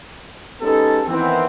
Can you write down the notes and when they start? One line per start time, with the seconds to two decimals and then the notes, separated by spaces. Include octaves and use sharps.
0.61 G#3 B3 C#4 D#4 G4 A4
1.06 D#3 E3 B3 C4